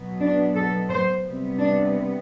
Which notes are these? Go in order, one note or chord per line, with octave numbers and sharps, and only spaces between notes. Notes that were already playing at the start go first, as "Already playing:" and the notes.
Already playing: B2 F#3 B3
D4
A4
C5
C3 G3 B3
D4